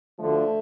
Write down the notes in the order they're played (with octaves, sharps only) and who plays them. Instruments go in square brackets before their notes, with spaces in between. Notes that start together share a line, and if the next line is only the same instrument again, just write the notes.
[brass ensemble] D2 D3 F3 A3